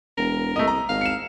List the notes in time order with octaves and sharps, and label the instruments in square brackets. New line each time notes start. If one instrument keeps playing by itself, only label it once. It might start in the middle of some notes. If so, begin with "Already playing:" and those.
[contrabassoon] E1 [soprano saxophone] A#4
[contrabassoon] C2 [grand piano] A3 D#5
[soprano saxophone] D#5 [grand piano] A#5
[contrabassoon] G#1 [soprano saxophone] F5
[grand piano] C#7 E7